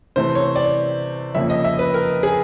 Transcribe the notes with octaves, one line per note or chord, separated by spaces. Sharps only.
C3 E3 A3 C5
C#5
D5
F2 C#3 F3 A#3 E5
D#5
E5
B4
A#4
G#4